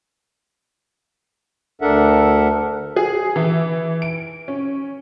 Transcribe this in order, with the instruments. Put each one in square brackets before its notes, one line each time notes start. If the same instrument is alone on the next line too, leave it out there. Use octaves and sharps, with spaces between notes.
[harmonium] D2 D4 A4 A#4 E5 F#5
[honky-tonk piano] G#4
E3
D7
C#4